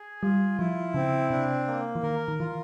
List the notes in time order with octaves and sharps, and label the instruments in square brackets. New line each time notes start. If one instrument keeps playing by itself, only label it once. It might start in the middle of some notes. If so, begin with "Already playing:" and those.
Already playing: [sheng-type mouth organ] G#4
[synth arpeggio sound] G3 [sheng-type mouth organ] F4
[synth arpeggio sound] F3 [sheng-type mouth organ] E4
[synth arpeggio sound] C#3 [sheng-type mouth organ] C4
[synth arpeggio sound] C3 [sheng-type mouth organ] D4
[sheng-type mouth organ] A#3
[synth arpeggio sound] E3
[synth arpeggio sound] D#3 [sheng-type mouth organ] A#4
[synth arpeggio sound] D#3
[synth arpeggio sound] E3 [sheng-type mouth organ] F4